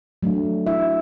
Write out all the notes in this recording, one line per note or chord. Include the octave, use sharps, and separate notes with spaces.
F#3 A3 D4
E4 E5